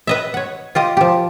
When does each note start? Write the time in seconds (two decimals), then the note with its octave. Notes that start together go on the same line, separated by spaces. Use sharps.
0.07 B4 D#5 E5
0.34 C#5 F#5
0.75 F4 G4 D#5
0.97 F3 G4